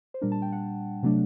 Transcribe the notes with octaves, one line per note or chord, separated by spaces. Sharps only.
C5
A#2 G3 D4 A#4
A5
G5
F#5
C3 F#3 A3 D4